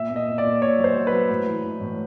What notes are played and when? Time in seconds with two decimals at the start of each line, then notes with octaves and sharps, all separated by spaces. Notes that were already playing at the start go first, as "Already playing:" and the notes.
Already playing: A#2 E5
0.10 A#2
0.16 D#5
0.27 A#2
0.38 D5
0.45 A#2
0.61 A#2 C#5
0.79 F#3
0.84 C5
0.96 F#3
1.07 B4
1.12 F#3
1.29 A2
1.47 E3
1.64 E3
1.81 A2